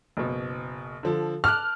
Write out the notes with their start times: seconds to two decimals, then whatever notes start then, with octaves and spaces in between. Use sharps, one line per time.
0.17 F#1 B2
1.03 D3 F3 A4
1.44 A5 D6 F6 F#6